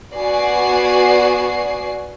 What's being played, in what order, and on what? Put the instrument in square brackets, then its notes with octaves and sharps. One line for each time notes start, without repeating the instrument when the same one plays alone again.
[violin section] B3 F#4 D5 G#5 C7